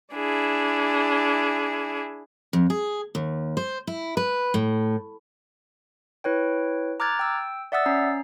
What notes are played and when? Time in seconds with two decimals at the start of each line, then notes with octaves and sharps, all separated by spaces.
0.14 D4 E4 G#4
2.53 F2
2.70 G#4
3.15 D#2
3.57 C5
3.87 E4
4.17 B4
4.54 A2
6.24 E4 B4 C#5 G5
7.00 A#5 D6 F6 F#6 G#6 A6
7.19 G5 E6
7.72 D5 E5 F#5 D#6 E6 A6
7.86 C#4 A#5 C7